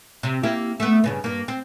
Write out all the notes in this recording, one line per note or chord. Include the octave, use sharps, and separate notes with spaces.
C3
A#3 E4 G4
A3 B3
G2 C#3 B3
G2 A#3
C4